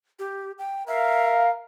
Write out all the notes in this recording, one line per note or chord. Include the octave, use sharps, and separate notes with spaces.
G4
G5
A#4 E5 F5